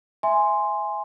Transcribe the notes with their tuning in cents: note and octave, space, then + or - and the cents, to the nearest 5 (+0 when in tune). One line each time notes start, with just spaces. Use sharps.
E5 +0 G#5 +0 C6 +0